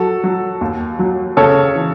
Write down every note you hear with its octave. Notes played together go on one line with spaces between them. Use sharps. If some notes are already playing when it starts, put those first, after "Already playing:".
Already playing: F#3 F#4 A4
F#3
D#2
F#3
C#3 A4 C#5
E3